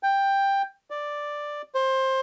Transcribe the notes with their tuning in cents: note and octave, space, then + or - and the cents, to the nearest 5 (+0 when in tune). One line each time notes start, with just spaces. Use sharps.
G5 +10
D5 +5
C5 +20